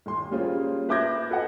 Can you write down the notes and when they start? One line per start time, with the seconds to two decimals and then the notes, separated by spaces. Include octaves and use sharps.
0.06 D#1 C6
0.31 G3 A#3 C#4 F4 G#4 C5
0.89 B4 E5 D6 G6 G#6 A#6
1.30 A4 B4 D#5 F#5